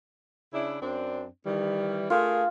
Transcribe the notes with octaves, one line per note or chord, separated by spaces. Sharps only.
C#3 D4 E4
F#2 C4 D4
D#3 E3 G3
A3 F4 G#4 A#4